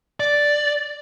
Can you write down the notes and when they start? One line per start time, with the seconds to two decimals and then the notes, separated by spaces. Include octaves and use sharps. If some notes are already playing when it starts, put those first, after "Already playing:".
0.20 D5